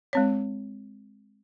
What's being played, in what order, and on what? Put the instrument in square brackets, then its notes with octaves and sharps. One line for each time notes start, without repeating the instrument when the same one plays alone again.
[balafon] G#3 C4 C#5